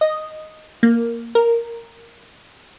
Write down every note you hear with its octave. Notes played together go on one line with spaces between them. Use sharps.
D#5
A#3
A#4